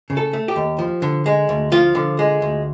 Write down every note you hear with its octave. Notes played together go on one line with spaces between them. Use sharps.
C#3
A4
A3
G4
D#2
F3
D3
G#3
D2
F3 F4
D3
G#3
D2